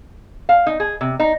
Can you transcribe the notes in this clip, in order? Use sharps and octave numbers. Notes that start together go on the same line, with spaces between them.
F5
D#4
G#4
C3
D#4